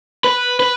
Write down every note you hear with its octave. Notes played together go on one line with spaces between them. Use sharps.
B4
B4